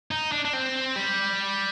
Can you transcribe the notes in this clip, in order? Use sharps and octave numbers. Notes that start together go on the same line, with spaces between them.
D#4
D4
D4
C4
G3